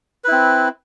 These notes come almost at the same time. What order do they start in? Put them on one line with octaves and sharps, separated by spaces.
B4 E4 C4